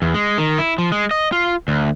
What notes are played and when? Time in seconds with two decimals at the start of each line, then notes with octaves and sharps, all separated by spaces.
0.02 E2
0.14 G#3
0.38 D#3
0.58 E4
0.78 F3
0.92 G#3
1.11 D#5
1.32 F4
1.68 D2